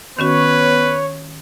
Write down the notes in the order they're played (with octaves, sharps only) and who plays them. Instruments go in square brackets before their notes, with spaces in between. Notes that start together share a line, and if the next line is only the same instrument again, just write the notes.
[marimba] D#3 C#4 F#4 [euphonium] B3 [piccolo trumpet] B4 [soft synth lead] C#5